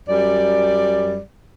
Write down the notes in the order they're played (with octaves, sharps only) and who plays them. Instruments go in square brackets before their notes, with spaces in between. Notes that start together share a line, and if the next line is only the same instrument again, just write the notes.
[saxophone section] F#2 G3 D5